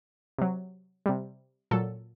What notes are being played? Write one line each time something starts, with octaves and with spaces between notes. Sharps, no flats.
C3 F#3
C3 G3
A#2 F#3 A4